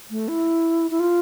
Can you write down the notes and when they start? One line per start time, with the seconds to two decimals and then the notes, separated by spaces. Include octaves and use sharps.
0.11 A3
0.28 E4
0.91 E4
1.00 F4